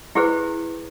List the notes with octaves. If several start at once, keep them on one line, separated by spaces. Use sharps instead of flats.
E4 G4 G#4 B4 C5